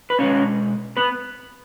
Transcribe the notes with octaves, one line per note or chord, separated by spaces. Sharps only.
B4
B2 G#3 C#4 C#5
B3 B4